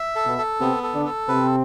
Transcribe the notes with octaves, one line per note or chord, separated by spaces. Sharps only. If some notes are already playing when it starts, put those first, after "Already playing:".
Already playing: E5
A4
B2 B3
A4
C3 B3 C4
A4
D3 D4
A4
C3 C4 B4